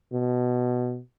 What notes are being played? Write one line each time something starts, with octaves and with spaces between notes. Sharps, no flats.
B2